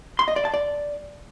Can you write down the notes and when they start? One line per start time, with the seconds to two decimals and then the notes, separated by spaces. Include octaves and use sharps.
0.19 C6
0.28 D#5
0.36 D5
0.45 A5
0.54 D5